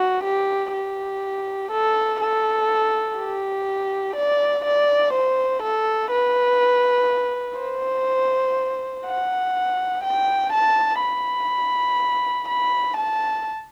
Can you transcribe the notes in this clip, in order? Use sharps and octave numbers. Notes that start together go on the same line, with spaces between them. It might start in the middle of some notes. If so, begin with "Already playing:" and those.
Already playing: F#4
G4
G4
A4
A4
G4
D5
D5
C5
A4
B4
C5
F#5
G5
A5
B5
B5
A5